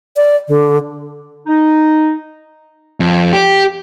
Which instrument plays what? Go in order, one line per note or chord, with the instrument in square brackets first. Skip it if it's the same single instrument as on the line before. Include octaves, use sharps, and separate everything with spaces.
[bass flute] D5
D3
[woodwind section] D#4
[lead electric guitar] F2
G4